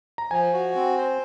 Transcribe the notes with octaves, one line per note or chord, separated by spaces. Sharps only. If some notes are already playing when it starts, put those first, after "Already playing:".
A#5
F3 G#5
F#4
C4
C5